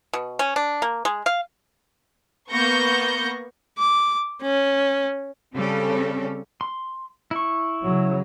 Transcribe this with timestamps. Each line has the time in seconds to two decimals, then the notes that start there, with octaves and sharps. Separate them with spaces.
0.13 B2
0.39 C#4
0.56 D4
0.82 A#3
1.05 G#3
1.26 F5
2.50 A#3 B3 C#6 G6 A#6 C#7
3.78 D6
4.42 C#4
5.55 C#3 G3 C4 C#4 A4
6.61 C6
7.31 E4 C#6
7.82 C#3 F#3